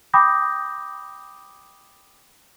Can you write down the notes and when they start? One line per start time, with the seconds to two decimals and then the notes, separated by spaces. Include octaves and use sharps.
0.14 G5 B5 D6 D#6 G6 A#6